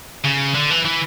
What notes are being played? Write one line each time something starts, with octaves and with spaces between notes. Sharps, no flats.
C#3
D3
E3
E3